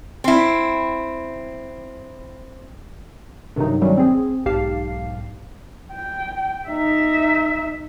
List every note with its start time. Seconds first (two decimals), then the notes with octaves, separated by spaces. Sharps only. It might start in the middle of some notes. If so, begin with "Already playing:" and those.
0.24 C4 E4
3.56 G2 C3 D#3 F#3 D#4
3.81 D#3 F#3 G3 A3 C#4
3.97 C4 G#4
4.46 B1 G#2 G4 F5 A5 C7
5.93 G5
6.68 D#4 E5